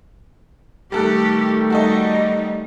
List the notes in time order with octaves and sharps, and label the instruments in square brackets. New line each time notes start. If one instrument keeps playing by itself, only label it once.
[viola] D#3 A3 [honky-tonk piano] G3 A4 F#6 [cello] G4
[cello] G3 D#4 [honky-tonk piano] F#4 A4 D#5